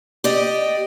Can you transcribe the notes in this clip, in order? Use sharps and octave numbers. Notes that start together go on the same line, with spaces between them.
G4 D5 D#5